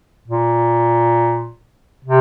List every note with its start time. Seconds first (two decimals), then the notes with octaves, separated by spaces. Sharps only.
0.28 A#2
2.05 C3